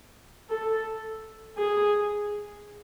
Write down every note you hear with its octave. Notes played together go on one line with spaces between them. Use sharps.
A4
G#4